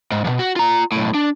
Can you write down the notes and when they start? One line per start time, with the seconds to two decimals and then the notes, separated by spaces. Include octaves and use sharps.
0.12 G#2
0.24 F2 B2
0.39 F#4
0.56 F4 A#5
0.92 B1 A2
1.14 D4